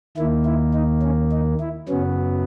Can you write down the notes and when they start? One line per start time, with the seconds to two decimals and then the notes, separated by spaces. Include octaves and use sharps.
0.17 D#2 D#3 A#3 E4
0.45 E4
0.74 D#4
1.02 C#4
1.32 D#4
1.60 E4
1.88 F#2 C#3 F#3 B3 C#4